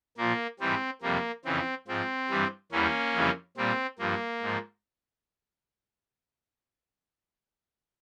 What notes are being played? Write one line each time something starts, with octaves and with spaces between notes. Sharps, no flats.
A#2 F3 A#3
G#2 E3 G3 C4
F2 C3 G3 A#3
F2 C#3 E3 C4
G#2 F3 C4
G2 E3 G3
E2 E3 G3 A#3 C#4
F2 C#3 E3 G3
A#2 G3 C4
G2 F3 A#3
G#2 F3